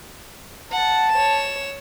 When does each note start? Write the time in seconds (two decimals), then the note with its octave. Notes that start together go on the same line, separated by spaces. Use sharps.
0.72 F#5 A5
1.13 C#5 E7